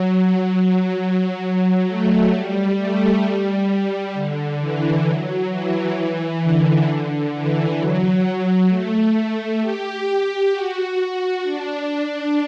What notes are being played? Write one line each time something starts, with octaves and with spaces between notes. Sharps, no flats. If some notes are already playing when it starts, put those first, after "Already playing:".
Already playing: F#3
F#3
F#3
A3
G3
A3
G3
D3
E3
F#3
E3
E3
D3
E3
F#3
A3
G4
F#4
D4